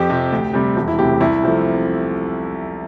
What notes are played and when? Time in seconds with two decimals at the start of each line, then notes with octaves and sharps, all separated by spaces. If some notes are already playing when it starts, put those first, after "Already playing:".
Already playing: F2 G4
0.10 C3 F3
0.32 D2
0.54 C3 G3
0.76 E1
0.88 E4
0.98 D2 C3 G4
1.20 C2 E4
1.43 C3 F3 A3